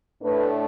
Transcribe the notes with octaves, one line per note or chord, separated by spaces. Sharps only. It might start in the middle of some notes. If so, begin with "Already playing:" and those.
A2 A3 D4 B4